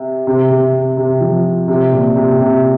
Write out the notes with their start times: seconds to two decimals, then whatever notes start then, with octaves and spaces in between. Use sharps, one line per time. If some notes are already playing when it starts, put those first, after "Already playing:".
Already playing: C3
0.27 C3
0.50 C3
0.97 C3
1.21 F3
1.68 C3
1.92 A#2
2.16 C3
2.40 C3